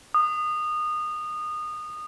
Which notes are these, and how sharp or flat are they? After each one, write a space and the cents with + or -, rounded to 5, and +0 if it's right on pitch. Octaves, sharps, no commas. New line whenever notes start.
D#6 -25